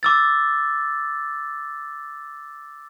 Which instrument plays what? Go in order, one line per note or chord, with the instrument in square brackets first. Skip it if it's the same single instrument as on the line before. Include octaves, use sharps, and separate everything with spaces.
[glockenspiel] D6 E6 A6